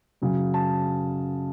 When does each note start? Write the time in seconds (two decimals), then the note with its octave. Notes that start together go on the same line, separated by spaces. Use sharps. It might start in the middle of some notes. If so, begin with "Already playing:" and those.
0.22 F#2 C#3 F#3
0.54 A5